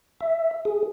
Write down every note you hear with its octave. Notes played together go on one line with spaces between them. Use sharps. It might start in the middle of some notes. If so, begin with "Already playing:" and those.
E5
G#4